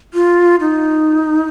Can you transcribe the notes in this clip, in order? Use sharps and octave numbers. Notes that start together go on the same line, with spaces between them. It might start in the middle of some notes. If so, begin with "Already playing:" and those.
F4
D#4